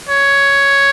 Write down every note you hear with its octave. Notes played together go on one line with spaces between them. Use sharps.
C#5